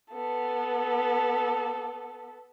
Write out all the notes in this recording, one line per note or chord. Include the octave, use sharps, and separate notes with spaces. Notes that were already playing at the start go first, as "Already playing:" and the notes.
B3 A4